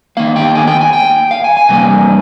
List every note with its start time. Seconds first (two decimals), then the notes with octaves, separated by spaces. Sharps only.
0.17 D#3 A#3 F5
0.36 G5
0.55 G#5
0.67 G5
0.81 G#5
0.93 G5
1.31 F5
1.44 G#5
1.57 G#5
1.69 C3 G3 A#3